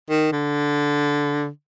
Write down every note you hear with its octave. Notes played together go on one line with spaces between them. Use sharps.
D#3
D3